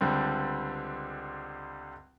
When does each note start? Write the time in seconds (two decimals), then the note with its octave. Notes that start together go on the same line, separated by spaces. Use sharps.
0.01 C#2 D3 G3 C4